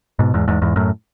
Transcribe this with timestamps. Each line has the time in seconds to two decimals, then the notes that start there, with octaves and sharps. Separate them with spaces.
0.19 G#2 B2
0.34 E2 G#2
0.48 E2 G#2
0.62 E2 G#2
0.76 F#2 A2